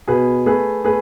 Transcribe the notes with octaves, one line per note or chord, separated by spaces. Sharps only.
B2 G#4 B4
A3 G#4 B4
A3 G#4 B4